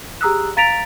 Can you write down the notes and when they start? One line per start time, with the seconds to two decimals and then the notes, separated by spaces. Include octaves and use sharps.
0.21 G4 G#4 A#5 D#6 E6 F#6
0.57 F5 A#5 A6 B6 D7 F7